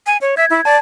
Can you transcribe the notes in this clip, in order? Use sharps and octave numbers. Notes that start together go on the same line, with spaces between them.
G#5
C#5
E5 G#6
E4
D5 A5